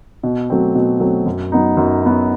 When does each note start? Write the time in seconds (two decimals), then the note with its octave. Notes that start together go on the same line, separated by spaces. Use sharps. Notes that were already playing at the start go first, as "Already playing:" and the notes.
0.23 B2
0.50 F#3 A3 C4
0.75 B2
1.00 F#3 A3 C4
1.26 F#2
1.52 F#3 B3 D#4
1.77 F#2
2.03 F#3 B3 D#4